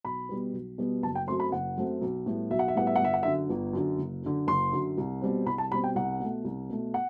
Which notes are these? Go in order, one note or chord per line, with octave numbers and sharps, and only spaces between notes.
B1 B5
B2 G3 B3
B1
B2 G3 B3
F#1 A5
G5
F#2 F#3 A3 C4 C6
B5
F#1 F#5
F#2 F#3 A3 C4
B1
A2 G3 B3
B1 E5
F#5
E5
A2 G3 B3 F#5
E5
F#5
G1 E5
F#5
F#2 D3 E5
G1
F#2 D3
F#1
F#2 D3
F#1 C6
F#2 D3
C2
B2 G3 C4
C2 B5
A5
B2 G3 C4 B5
G5
C2 F#5
B2 A3
C2
B2 A3
F#5